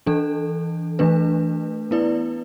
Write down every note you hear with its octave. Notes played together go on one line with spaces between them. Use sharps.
E3 D4 A4
E3 A3 D4 B4
B3 E4 B4 D5